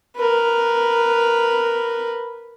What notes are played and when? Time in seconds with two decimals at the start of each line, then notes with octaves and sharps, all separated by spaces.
0.16 A#4 B4